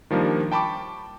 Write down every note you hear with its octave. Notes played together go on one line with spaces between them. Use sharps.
D#3 F3 G3 A#3 D4
G5 A5 B5 C#6 D6